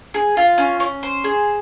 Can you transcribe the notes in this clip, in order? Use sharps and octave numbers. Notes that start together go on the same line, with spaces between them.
G#4
F4
C#4
C#4
C5
G#4